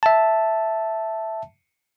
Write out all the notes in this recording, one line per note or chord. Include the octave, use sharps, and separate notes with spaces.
E5 A5